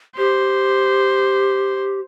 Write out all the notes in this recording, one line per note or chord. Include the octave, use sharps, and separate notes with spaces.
G4 C5